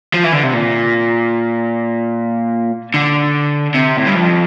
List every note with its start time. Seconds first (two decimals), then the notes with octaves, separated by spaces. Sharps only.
0.14 F3
0.24 E3
0.33 D3
0.43 C3
0.53 A#2
2.94 D3
3.75 C3
3.97 A2
4.07 G2
4.15 F2